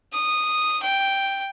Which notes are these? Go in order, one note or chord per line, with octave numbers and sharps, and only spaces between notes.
D#6
G5